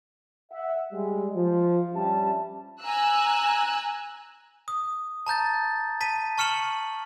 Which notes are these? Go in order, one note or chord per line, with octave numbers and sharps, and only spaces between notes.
E5 F#5
G3 G#3
F3
G2 G3 C#4 G4 E5 A5
G#5 A#5 E6 F#6
D#6
A5 A#5 G6 A6
A5 B6 D#7
A5 C#6 F6 C#7 E7 F#7